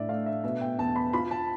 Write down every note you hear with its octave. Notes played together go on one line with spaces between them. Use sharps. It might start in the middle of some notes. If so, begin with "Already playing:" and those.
Already playing: A2 D4 D5 E5
A3 F5
E5
B2 E5
G5
E2 A5
B5
F4 B5
A5